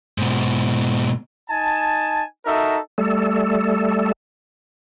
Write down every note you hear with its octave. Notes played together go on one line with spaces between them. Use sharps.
G#2 B2
D#4 G#5 A5
D#4 F#4 A4 A#4 E5
G3 A3 A4